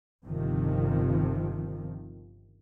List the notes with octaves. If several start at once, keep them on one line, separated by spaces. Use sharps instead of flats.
G1 C3 D#3 F3